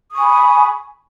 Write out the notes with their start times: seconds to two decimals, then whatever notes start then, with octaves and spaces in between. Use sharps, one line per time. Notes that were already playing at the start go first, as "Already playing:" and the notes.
0.11 D#6
0.15 C#6
0.19 G#5
0.23 B5